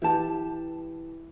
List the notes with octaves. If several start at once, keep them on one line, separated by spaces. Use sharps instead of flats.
E3 E4 G4 A5